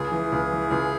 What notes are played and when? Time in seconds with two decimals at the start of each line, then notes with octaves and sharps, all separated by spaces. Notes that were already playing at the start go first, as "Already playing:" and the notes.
Already playing: C#2 G#4
0.12 E3
0.32 C#2
0.52 E3
0.71 C#2